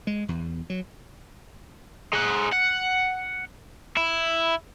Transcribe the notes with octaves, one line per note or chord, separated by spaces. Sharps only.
G#3
E2
F#3
G#3 F#5
F#5
E4